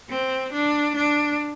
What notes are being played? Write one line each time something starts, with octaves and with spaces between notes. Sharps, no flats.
C4
D4
D4